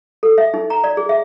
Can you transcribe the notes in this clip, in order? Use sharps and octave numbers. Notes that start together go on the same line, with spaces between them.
A4
E5
D#4
A#5
D5
G#4
E5